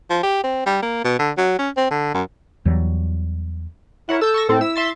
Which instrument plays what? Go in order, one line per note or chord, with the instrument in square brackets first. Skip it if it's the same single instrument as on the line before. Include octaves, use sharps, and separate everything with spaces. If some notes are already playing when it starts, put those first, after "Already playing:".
[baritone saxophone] F3
G4
C4
G3
A#3
B2
D3
F#3
C#4
C4
D3
F#2
[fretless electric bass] E2 E3 F#3 G3
[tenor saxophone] E4 [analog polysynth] A#4 C#5 F#5
[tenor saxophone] A4 [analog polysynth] E6 G6
[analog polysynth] C#6 E6 A#6
[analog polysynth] A2 C4 [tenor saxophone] A4
[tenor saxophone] E4 [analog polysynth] E6
[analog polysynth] E5 C6 A6